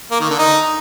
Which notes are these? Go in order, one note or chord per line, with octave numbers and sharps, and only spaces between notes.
A#3
D#3
D3
D#4